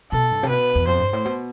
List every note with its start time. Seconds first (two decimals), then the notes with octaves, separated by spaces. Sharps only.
0.12 B2 A4
0.31 G2
0.43 C3
0.49 B2 B4
0.75 E2
0.87 F2 C5
1.00 G2
1.13 A2
1.25 B2